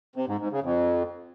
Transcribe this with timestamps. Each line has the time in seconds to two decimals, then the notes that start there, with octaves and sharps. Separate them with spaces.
0.16 C3
0.28 G#2
0.40 G#2
0.52 C#3
0.64 F2